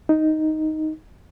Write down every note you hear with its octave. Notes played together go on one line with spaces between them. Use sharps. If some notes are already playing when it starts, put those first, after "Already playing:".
D#4